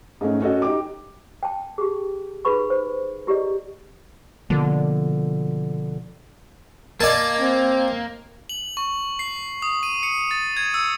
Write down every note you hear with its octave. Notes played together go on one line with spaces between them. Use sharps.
G#2 G#3 A3 C#4 D#4
C#4 F#4 A4 D#5
D#4 G4 D6
G5 A5
G4 G#4
D#4 G#4 B4 B5 C#6
C5
E4 G4 G#4 D5 D#5
B2 D3 F3 A#3
A#3 A#4 D5 D#5 G#5 A5
C4
F#7
C#6
C7
D#6
D#7
C#7
A6
G#6
E6